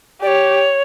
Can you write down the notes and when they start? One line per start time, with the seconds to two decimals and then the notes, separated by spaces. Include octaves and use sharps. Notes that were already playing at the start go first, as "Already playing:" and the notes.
0.22 G4 D5
0.27 C#5